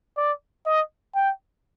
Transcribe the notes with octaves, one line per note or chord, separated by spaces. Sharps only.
D5
D#5
G5